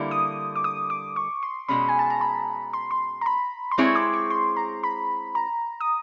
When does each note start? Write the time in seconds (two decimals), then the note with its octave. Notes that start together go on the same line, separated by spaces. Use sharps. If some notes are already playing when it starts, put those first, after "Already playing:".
Already playing: D3 G3 A#3 E4
0.11 D#6
0.56 D6
0.64 D#6
0.90 D6
1.16 C#6
1.43 C6
1.68 B2 G#3 C#4 B5
1.89 G#5
1.99 A5
2.10 A#5
2.21 B5
2.73 C6
2.91 C6
3.21 A#5
3.26 B5
3.71 C6
3.78 G#3 C4 E4 G#4 C#5 C#6
3.95 D6
4.13 C#6
4.30 C6
4.56 A#5
4.83 B5
5.35 A#5
5.80 D#6